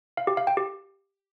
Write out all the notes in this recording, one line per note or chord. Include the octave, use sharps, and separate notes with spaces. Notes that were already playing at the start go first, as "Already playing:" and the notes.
F5
G4
F5
G5
G4